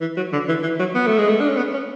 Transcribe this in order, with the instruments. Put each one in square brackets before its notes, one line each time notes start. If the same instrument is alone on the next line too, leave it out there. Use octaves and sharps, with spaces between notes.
[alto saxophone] E3
F#3
D3
E3
E3
F#3
B3
A3
G#3
A3
D4
C#4
B3
C#4